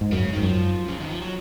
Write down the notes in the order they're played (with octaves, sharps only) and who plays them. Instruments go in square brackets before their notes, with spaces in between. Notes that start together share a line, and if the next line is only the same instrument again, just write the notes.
[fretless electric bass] G#2
[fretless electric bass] F#2 [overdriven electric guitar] C#3
[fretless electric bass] G#2 [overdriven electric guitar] D#3
[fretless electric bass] F#2 [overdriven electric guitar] F3
[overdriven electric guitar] C#3
D#3
F3
F#3